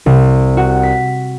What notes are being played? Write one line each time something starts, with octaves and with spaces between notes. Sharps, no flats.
C2
F#4
B6